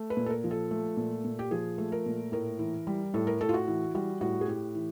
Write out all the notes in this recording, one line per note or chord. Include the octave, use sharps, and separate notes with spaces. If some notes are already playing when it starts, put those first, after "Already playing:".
Already playing: A3
B4
A#2
A4
A#4
F3
A4
A3
A#2
A#2
G4
F3 G#4
A3
A#4
A#2
A2 A#4
E3
G3
A2 A4
A#4
A2 A4
F4
F#4
E3
G3 F#4
A2 F#4
G#4
A2 G4
E3